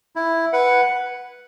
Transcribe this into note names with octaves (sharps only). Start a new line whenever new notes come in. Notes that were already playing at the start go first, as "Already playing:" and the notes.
E4
B4 F#5